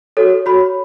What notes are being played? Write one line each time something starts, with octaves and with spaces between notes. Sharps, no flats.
F#4 A4 C#5
F#4 C#5 B5